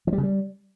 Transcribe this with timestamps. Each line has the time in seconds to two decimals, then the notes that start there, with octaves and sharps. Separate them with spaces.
0.07 F3
0.13 G3
0.18 C#3
0.23 G3